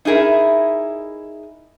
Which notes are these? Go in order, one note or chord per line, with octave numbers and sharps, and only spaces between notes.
D#4 E4 G#4 A#4 E5